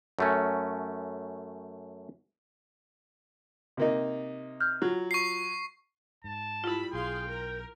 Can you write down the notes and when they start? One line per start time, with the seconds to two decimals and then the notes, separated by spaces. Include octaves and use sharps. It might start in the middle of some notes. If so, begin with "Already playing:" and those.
0.19 F#2 A3 C#4
3.77 C3 A#3 D#4
4.60 F6 G6
4.82 F#3 F4
5.11 C#6 C7
6.24 G#2 A5
6.64 G3 E4 F4 B5
6.93 B1 G#4 F5 G5 C6
7.28 A#4